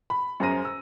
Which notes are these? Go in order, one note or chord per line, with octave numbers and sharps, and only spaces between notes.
B5
F#2 G#4 C5 A#5 A#6 D#7
E6